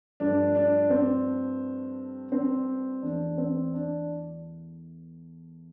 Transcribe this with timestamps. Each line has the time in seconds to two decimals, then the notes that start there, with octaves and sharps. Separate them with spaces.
0.20 G2 F3 A3 D4
0.55 D4
0.90 C4
2.32 C4
3.02 E2 E3 A3 D4
3.38 C4
3.73 D4